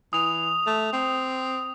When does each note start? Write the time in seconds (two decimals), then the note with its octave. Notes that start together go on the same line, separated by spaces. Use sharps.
0.13 E3 D#6 F7
0.66 A3
0.93 C4